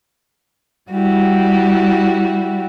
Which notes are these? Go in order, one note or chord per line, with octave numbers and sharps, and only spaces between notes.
G3 E4 F#4 G4